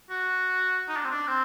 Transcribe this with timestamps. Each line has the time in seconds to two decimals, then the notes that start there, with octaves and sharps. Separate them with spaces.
0.10 F#4
0.89 D#4
0.97 D4
1.04 C4
1.11 D4
1.28 C4